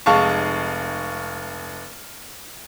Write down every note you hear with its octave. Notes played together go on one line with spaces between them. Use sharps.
F1 G#3 F5 A5 C#6